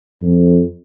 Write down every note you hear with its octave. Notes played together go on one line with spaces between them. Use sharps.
F2